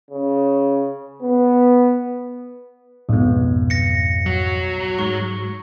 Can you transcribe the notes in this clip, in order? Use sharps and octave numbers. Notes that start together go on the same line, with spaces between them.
C#3
B3
B1 F2 G#2 B3
A#6 C#7
F#3
G#2 C#6